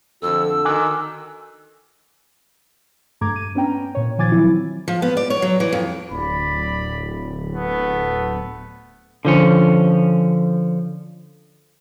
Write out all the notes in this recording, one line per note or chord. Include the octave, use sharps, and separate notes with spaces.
F2 D3 F#4 A4 E6
D#3 G#5 D6 F#6
G2 A3 A#5 D6 G#6
D#7
B3 C#4 D4 G5 A#5
A#2 C#5
D#3 F3 G#5 D6 G#6 A6
E3 F#3 C4 E4
F3
B3
D5
C#5
F#3
E3
F2
D1 D5 B5
A3 B3
D3 F3 C#4